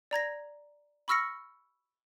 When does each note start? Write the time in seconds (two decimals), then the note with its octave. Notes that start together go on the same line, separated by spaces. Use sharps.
0.11 D5 A#5 G#6 A#6
1.08 B5 C#6 E6 F6 A#6 C#7